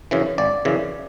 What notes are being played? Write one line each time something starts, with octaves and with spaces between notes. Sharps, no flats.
F#2 C#3 E3
G#1 D5
F#2 C#3 E3